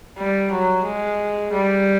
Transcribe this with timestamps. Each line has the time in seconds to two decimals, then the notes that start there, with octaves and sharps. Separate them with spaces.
0.18 G3
0.52 F#3
0.85 G#3
1.53 G3